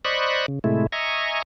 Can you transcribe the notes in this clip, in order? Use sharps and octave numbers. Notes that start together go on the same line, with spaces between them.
C5 D5 D#5 B5 C#6 F#6
C#3
A2 C3 G#3 A3 E4
D#5 E5 G#5 A#5 C#6